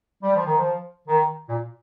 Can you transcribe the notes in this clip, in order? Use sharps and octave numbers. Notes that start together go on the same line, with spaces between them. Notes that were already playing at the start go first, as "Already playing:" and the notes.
G3
F3
D#3
F3
D#3
A#2